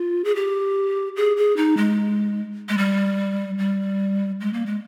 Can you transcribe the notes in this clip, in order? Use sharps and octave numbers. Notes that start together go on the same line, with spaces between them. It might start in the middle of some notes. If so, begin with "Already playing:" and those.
Already playing: F4
G#4
G4
G#4
G#4
D#4
G#3
G#3
G3
G3
G#3
A#3
G#3